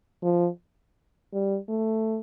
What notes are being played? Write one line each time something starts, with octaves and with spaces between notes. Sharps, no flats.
F3
G3
A3